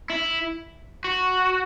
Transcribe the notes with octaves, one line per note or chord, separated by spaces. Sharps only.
E4
F#4